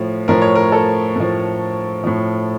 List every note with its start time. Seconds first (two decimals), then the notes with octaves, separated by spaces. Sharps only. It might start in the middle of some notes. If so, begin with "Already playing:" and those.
Already playing: A2 F3
0.28 A2 F3 A#4
0.42 C#5
0.55 A#4
0.72 A4
1.16 A2 F3
2.04 A2 F3